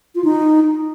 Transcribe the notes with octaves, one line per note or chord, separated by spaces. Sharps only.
F4
D#4